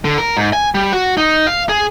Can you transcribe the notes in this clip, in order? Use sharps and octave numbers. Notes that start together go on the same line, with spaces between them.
D3
A#4
G#2
G#5
G3
F#4
D#4
F5
G#4